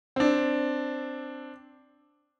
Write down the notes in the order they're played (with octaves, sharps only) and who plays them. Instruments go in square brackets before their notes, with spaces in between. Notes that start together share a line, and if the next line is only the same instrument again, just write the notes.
[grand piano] C4 D4